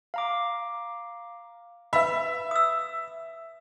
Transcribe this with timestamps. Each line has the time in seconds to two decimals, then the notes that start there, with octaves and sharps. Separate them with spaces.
0.14 F5 A#5 D6
1.93 B4 E5 F5 B5
2.51 D#6 E6